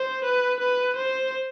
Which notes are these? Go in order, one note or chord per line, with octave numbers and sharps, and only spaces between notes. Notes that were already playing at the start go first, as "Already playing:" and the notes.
Already playing: C5
B4
B4
C5